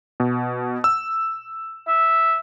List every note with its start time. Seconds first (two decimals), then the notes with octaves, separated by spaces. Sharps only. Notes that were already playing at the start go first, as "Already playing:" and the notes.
0.20 B2
0.84 E6
1.88 E5